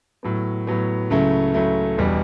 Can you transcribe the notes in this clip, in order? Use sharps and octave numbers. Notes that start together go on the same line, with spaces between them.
A2 F#3 B3
A2 F#3 B3
C#2 C#3 F#3 A3 E4
C#2 C#3 F#3 A3 E4
E1 E2 B2 G3 B3